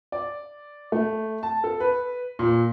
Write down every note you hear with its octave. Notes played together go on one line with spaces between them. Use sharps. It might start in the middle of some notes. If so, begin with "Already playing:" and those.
D5
A3
A5
A4
B4
A#2